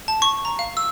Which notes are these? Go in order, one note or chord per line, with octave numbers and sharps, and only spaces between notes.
A5
C#6
A#5
F5
E6